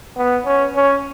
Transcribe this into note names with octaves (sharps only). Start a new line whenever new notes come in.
B3
C#4
C#4